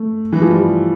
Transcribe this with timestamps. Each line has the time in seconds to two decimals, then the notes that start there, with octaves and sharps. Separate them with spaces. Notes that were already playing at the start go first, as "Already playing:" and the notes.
Already playing: A3
0.32 E3
0.42 F3
0.51 G3